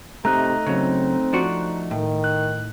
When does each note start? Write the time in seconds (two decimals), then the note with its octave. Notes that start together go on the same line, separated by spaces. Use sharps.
0.25 C3 A3 D#4 D#5 A#5 F#6 A#6
0.66 C#3 F#3 C4
1.33 F3 D4 F#4
1.91 A2 D#3
2.24 F#6